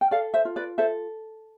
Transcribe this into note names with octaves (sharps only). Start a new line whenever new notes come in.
G5
A4 D5 F5
C5 E5
F4
B4 D5
A4 C5 E5